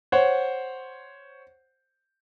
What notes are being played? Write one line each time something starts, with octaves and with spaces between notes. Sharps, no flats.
C5 C#5 F#5